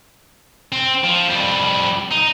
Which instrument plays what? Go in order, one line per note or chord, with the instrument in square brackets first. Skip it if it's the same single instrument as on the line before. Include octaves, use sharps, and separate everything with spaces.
[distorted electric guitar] C4
F3
F2 G3
D#4